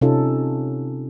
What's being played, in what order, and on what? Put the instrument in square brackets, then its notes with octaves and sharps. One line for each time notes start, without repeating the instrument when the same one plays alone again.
[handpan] C3 C#4 D#4 F4 A4